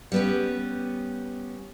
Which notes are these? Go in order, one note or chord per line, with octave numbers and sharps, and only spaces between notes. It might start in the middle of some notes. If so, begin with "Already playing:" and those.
G3 B3 C#4